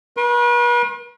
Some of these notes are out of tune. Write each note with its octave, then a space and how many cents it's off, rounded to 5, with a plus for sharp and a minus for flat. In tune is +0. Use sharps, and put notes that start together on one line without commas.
B4 -40 C6 +40